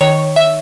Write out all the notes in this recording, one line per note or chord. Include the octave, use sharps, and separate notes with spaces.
D#3 C#5
E5